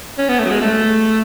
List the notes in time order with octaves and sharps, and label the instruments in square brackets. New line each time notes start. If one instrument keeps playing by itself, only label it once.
[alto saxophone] C#4
B3
A3
F#3
G#3
A3